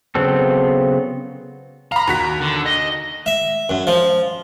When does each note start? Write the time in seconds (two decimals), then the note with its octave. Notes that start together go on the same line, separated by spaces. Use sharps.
0.15 C#3 F#3 B3 C4 A4
1.92 F5 A#5 B5
2.07 D#2 F#4 B6
2.41 D3
2.66 D#5
3.26 E5
3.69 F#2
3.87 F3